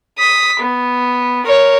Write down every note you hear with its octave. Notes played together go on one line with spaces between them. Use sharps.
D#6 B6
B3
A#4 C#5